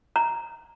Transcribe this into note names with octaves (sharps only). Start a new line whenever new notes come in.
A#5